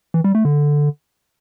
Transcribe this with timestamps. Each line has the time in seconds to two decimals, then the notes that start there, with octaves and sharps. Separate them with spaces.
0.14 E3
0.24 G3
0.35 A3
0.45 D3